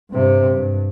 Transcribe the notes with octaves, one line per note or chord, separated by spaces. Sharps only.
G2 C3
G2